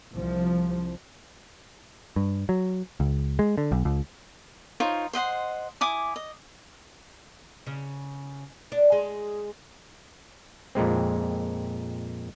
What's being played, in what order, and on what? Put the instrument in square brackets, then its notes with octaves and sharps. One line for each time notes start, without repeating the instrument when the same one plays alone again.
[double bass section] C2 F3
[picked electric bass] G2
F#3
C#2
G#3
D3
B1
C#2
[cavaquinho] D#4 F4 C5 C#5
C5 D#5 F#5 C6
E4 G#5 D6 D#6
D#5
[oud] C#3
D4
G#3
[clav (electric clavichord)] F2 A#2 G#3 C4